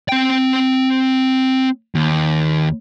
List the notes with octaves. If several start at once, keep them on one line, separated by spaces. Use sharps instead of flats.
C4 G5
D#2